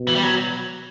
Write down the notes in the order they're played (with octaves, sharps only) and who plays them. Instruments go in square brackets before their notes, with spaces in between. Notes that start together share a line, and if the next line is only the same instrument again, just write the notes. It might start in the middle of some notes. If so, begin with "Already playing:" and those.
Already playing: [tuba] B2
[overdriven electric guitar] E3
G3
F#3